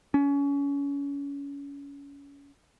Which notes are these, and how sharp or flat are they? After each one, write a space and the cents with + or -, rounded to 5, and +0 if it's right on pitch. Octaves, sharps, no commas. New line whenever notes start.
C#4 +30